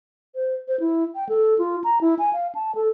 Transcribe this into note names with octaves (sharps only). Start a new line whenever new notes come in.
C5
C5
E4
G5
A4
F4
A#5
E4
G#5
F5
A5
A4